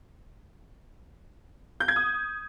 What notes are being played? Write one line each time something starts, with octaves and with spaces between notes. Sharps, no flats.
G6
G#6
D#6